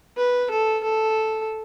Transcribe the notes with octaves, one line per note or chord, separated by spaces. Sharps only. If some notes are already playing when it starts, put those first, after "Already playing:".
B4
A4
A4